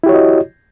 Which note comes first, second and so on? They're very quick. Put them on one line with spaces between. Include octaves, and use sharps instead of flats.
E4 G4 C#5 F#4 D#5